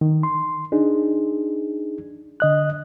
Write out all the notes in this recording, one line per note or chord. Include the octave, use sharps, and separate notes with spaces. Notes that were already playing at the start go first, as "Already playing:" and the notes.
D#3
C6
D4 D#4 G#4
D3 D#5 F#6